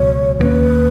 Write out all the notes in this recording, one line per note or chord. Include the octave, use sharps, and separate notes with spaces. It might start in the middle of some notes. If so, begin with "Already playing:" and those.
Already playing: C#2 B2 F#3 C#5
D#2 D#3 A#3 C#4 B4